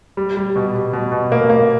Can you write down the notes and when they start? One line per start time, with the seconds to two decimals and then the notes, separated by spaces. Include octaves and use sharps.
0.17 G3
0.37 G3
0.56 B2
0.75 G3
0.93 B2
1.12 B2
1.32 A#3
1.50 A#3